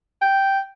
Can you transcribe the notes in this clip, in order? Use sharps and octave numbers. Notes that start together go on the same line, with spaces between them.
G5